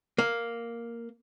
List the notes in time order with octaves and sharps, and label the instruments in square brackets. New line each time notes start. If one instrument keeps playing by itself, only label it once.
[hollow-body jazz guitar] A#3